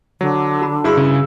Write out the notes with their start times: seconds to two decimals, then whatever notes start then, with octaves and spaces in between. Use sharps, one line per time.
0.21 D3 F#3
0.62 F#4 B5
0.84 G2 E4 F#4 G#4 C6 E6
0.97 C#3